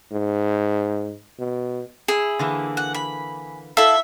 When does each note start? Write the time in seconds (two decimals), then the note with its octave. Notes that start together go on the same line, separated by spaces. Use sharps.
0.11 G#2
1.39 B2
2.08 E4 G#4
2.39 D3 E3 A#3
2.77 F#5
2.94 B5
3.77 E4 A4 E5 F5